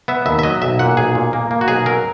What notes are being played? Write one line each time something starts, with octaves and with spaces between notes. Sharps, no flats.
B3 E5
D#2 E5
E5
F#3 D#5
B1 E5
A#2 F#5
B1 G#4
A#2
A#3
A#3
F#4
B1 G#4
F#3 A#4